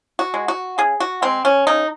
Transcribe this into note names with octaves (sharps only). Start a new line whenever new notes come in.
F#4
G#3
F#4
C#3 G#4
F#4
G#3 C4
C#4
C#3 D#4